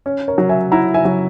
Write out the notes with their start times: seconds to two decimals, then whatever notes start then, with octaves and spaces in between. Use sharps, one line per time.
0.06 C#4
0.28 A#4 C#5
0.38 F#3
0.49 E5 G#5
0.71 E4 F#5 A#5
0.94 E5 G#5
1.05 F#3